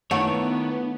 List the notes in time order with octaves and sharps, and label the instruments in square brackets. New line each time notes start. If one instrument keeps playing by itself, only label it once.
[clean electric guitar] D#3 C#5 [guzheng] A3 [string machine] B3 [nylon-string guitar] D4 E4 F#5